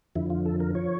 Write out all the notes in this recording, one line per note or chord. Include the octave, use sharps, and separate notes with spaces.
F2 D3 F3 E4
F4
A4
A#4
F3 C#5